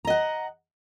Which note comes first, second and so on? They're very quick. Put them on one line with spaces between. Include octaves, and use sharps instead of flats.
A#5 D#5 F#5